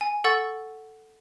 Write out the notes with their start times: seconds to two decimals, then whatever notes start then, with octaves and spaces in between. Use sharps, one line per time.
0.01 G#5
0.24 A4 F#5 C#6 E6 A6